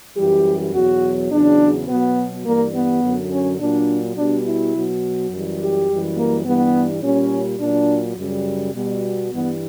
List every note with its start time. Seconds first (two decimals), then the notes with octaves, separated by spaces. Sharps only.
0.16 F#2 E3 G3 G4
0.74 E2 B2 F#3 F#4
1.31 E2 C#3 F#3 D4
1.89 B2 F#3 B3
2.46 G2 E3 G3 A#3
2.74 B3
3.03 F#2 D3 F#3
3.31 C#4
3.60 A#2 F#3 D4
4.17 B2 G3 D4
4.46 E4
4.74 B2 F#3
5.31 F#2 E3 G3
5.60 G4
5.89 F#2 E3 G3
6.17 A#3
6.46 G2 E3 G3 B3
7.03 A#2 G3 C#4
7.60 A#2 F#3 D4
8.17 F#2 C#3 G3
8.75 B2 G3
9.32 G2 E3 G3 B3